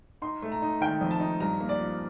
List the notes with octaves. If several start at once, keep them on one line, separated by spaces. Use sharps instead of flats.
D#4 C6
A3
A#5
D#4
D#3 G5
F2
A5
D#4
G2 A#5
A#3
D5
F3